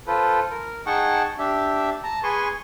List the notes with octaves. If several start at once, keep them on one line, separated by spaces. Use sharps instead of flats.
F4 A4 B4 C5
A#4
D#4 G#4 F#5 G5 A5 C#6
D4 G4 E5
A5 A#5
G#4 B4 G#5 C6 C#6